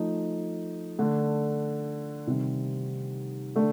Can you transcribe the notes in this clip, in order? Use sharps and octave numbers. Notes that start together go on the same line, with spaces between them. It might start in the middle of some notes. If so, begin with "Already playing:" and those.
Already playing: F3 A3 D#4
D3 A3 D4
C3 D#3 G3 C4
D3 A3